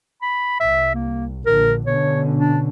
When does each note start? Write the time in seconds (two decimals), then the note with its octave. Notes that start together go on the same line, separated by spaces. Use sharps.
0.22 B5
0.60 C2 E5
0.95 A#3
1.46 A#1 D3 A#4
1.86 B2 D3 C#4 C#5
2.37 D4